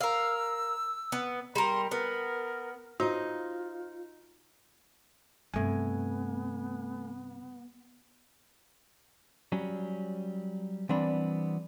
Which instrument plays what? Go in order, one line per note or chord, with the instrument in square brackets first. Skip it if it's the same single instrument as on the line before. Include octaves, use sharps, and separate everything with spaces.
[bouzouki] A#4 F5 [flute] E6
[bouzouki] B3
[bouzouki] G3 A#4 [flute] C6
[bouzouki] B3 [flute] A#4
[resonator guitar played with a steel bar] D#4 [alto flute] F4 [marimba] F#4 [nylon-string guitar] C5 D#5
[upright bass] G2 C3 [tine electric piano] A3 G#5 [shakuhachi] B3
[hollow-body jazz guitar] F#3 G3 C#4
E3 G3 B3 C4 D4